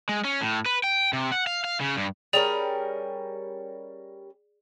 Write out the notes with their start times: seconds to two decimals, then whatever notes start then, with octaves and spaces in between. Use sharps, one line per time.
0.09 G#3
0.24 C#4
0.41 A2
0.66 B4
0.84 G5
1.13 C3
1.32 F#5
1.47 F5
1.64 F5
1.80 C#3
1.97 G2
2.33 G3 C#4 G#4 A#4 D5 F7